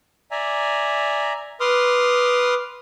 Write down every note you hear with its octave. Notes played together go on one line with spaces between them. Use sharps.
D5 E5 G#5 A#5
B4 C6 D6 D#6 F6